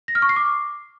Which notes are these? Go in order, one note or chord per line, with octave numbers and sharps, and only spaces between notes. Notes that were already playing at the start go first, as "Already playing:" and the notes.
A#6
F6
C#6
C7
D6